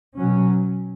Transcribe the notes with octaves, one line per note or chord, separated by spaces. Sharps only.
B2 F#3 C#4